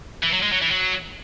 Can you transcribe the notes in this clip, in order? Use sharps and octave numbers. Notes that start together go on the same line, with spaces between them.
E3
F#3
G#3
F#3
E3
F#3